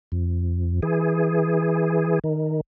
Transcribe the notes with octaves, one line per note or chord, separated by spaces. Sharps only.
F2
E3 G#4
D#3